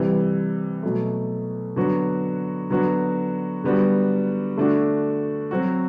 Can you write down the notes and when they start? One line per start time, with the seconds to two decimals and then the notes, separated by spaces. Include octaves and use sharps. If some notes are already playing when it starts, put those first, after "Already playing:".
Already playing: C3 E3 G3
0.83 B2 F#3 A3
1.76 D3 F#3 B3 F#4
2.70 D3 F#3 B3 F#4
3.64 D3 G3 B3 F#4
4.57 D3 A3 D4 F#4
5.51 F#3 C4 F#4